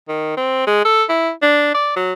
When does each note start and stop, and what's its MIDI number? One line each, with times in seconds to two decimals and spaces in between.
0.09 0.35 51
0.37 0.65 60
0.67 0.84 56
0.85 1.04 69
1.09 1.31 64
1.42 1.70 62
1.74 1.93 74
1.96 2.13 54